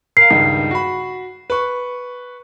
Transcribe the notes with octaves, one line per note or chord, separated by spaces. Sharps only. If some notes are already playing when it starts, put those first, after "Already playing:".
A#4 F5 C7
C#2 G2 D#3
F#4 B5
B4 C#6